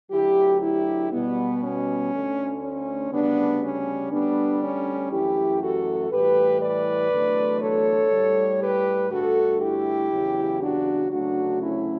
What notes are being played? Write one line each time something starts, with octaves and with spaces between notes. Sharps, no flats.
D2 D3 F#3 E4 G4
E4 G4
B2 G3 B3
C#4
D2 D3 A3
C#4
D2 C#3 G3 B3 D4
C#4
D2 D3 G3 B3 D4
C#4
F#2 E3 A3 E4 G4
F#4 A4
A2 E3 G3 G4 B4
B4 D5
E2 D3 F#3 A3
A4 C#5
A2 G3
G4 B4
G2 D3 A3 F#4 A4
E4 G4
E2 C#3 F#3
D4 F#4
D2 C#3 F#3 A3 D4 F#4
C#4 E4